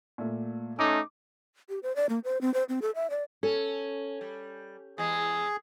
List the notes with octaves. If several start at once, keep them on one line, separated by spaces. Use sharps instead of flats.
A#2 A3
A3 C#4 D#4 D6
G4
C5
D5
A#3
C5
C4
C5
C4
A4
E5
D5
C#4 A4
G3
E2 G#3 G#4